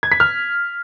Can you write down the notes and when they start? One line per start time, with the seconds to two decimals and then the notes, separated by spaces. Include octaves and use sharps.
0.03 G#6
0.12 B6
0.20 F6